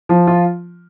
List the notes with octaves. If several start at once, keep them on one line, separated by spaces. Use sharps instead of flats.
F3
F4